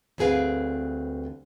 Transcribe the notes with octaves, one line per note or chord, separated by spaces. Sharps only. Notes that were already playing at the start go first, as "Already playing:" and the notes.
D2 G2 C4 G#4 B4 F5